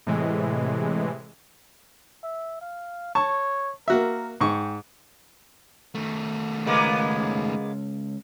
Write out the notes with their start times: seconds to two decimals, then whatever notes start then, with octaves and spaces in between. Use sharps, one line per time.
0.07 A2 C3 E3 G#3
2.23 E5
2.61 F5
3.15 C#5 A5 C#6
3.88 A#3 F#4 A#4 E5
4.41 G#2 G5 C#6
5.95 D#3 A3
6.66 C#2 G#3 A#3 B3